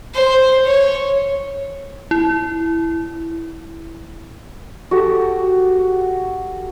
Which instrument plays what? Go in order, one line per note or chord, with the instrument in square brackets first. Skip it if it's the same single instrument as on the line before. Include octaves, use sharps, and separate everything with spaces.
[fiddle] C5
C#5
[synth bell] E4
[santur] F#4 G4 A4